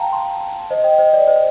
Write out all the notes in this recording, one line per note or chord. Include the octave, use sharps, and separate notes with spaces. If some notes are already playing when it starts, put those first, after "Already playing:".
Already playing: F5 G5 A5 A#5
A5 C6
C5 D#5
D#5 G5
C5 D#5
D5
C5 D#5